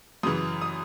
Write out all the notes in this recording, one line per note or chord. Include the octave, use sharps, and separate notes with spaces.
F#2 C#3 E3 D#6
D#6